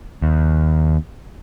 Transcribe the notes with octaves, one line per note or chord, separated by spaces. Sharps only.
D#2